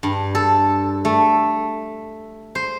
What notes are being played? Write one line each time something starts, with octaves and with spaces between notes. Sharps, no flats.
G2
A4
A3
C5